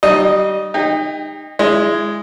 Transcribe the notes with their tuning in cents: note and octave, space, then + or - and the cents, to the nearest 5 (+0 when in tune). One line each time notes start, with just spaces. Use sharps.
G3 -30 D#4 -35 D#5 +5
D#4 -15 G4 +35 G5 +5
G#3 +0 E4 +20 D#5 +0